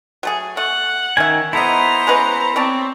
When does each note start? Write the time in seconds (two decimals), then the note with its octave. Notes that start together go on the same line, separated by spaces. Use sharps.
0.23 F#3 A3 G#4
0.57 A3 F#5 C#6
1.17 D#3 C#4 E5 G#5
1.53 B3 E4 A4 C5 D#5 A#5
2.07 G#3 C#4 B4
2.56 C4 C#5 D5 A5